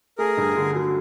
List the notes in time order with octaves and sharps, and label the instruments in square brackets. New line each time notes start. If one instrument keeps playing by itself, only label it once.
[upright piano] A3 [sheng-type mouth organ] G#4 A#4
[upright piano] G2
D3
F#3